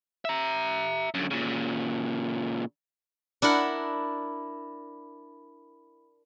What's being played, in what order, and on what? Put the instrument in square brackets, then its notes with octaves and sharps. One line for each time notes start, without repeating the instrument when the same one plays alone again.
[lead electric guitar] E5 A#5
F#2 D3
A#2 C#3
[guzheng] D4 E4 A#4 F#5